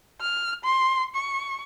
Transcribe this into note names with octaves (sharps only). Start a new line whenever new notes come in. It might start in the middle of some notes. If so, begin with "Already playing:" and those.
F6
C6
C#6